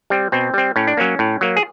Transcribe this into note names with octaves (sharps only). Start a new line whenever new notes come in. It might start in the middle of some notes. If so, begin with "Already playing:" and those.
G3 C4
B2 C4
G3 C4
A2 C#4
D4
F#3 A#3 C#4
A2
F#3 A#3
G#4